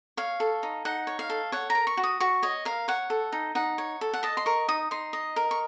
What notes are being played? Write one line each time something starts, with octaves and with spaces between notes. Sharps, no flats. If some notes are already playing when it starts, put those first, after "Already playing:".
C#5 F5
A4
D#4
D#4 F#5
C#5
F5
A4
C#5 F#5
A#5
A#4
C#6
F#4
D#6
F#4 C#6
C#5 D#5
A#4 F5
C#5 F#5
A4
D#4
D#4 F#5
C#5
A4
F#5
D#5 A5
C6
A#4 C#6
D#4 D#6
D#4 C6
D#5
A#4
C#6